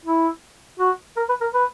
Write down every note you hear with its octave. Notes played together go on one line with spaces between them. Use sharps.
E4
F#4
A#4
B4
A#4
B4